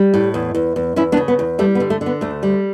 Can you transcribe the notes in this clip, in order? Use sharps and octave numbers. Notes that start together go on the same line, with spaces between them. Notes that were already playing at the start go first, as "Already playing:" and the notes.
Already playing: G3
A2
E2
E2
E2
E2 C#4 E4
B3 D4
C#3
B3
E2
G3 A3
B3
D3
A3
D3
B3
D2 A3
G3